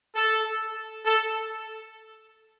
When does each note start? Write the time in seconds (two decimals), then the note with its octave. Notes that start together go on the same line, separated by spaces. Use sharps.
0.16 A4
1.05 A4